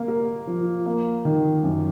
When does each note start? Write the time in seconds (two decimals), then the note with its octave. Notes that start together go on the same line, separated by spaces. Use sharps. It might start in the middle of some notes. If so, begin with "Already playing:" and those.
Already playing: A#3
0.08 A#4
0.47 F3
0.86 A#3
1.25 D#3
1.63 F#2